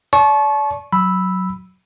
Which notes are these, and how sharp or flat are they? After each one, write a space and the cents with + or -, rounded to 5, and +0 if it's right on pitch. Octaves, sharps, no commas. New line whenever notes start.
D5 -30 A5 -35 C#6 -15
F#3 +0 B5 +0 E6 -5